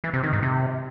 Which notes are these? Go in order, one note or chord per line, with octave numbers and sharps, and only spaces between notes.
E3
C3
D#3
G#2
C3